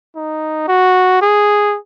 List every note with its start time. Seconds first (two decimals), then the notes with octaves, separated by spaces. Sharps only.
0.16 D#4
0.68 F#4
1.22 G#4